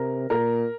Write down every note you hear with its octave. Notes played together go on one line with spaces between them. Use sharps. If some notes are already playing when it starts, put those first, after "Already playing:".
Already playing: C3 A#4
A#2 A#4